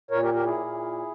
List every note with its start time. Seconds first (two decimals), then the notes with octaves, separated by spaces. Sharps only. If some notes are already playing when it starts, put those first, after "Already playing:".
0.11 A#2 A#4 C#5
0.23 G4 A#4
0.34 G4 A#4
0.45 E4 G#4
0.57 A#2